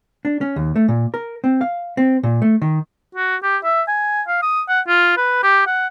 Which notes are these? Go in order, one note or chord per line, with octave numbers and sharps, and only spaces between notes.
D4
C#4
D#2
A3
A#2
A#4
C4
F5
C4
A#2
A3
D#3
F#4
G4
E5
G#5
F5
D#6
F#5
F4
B4
G4
F#5